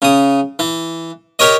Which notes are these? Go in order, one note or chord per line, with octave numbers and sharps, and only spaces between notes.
C#3 D#6
E3
G4 A#4 C#5 D#5